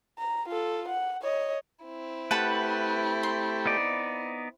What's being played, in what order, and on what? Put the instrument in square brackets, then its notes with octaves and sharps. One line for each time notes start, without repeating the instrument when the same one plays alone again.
[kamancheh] A#5
F4 A4
F#5
C#5 D#5
[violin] C4 E4
[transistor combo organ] A3 G4 [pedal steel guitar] B4 [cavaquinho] F#5 A5 B5
[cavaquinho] C6
[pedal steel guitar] B3 D#4 D5